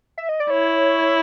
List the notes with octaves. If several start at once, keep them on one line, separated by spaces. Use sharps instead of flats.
E5
D#5
D5
E4 C#5